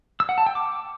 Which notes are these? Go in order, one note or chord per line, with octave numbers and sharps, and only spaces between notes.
E6
F#5
A5
G5
D6